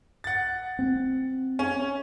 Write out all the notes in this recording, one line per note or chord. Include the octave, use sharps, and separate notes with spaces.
F#5 A6
C4
C#4